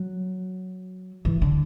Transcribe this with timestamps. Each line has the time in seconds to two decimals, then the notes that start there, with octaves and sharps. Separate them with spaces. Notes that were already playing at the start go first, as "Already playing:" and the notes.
Already playing: F#3
1.25 E3
1.42 D3